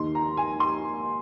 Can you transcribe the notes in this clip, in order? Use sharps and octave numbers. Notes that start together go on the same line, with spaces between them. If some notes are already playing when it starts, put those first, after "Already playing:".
Already playing: D#2 D#3 C6
A#5
G#5
C6